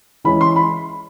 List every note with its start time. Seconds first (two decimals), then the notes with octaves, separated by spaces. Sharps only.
0.24 E3 G#3 C#4 E4 B5
0.41 C6
0.56 B5